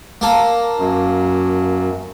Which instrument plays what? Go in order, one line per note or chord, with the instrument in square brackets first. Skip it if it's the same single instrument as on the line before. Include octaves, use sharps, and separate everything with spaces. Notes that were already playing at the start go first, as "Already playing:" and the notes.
[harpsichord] A#3 A4
[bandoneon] F#2